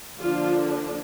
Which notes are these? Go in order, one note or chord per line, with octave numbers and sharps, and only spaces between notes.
D3 F3 A#3 D4 F4